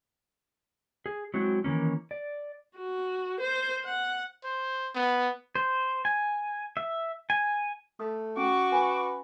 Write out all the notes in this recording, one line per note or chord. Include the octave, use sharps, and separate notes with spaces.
G#4
F#3 G#3 C4 E4 F#4
D#3 E3 A#3 C#4
D5
F#4
C5
F#5
C5
B3
C5
G#5
E5
G#5
A3 D#6
C#4 F#4 C#6 D6
B4 G#5